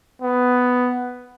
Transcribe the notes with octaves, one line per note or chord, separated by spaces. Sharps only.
B3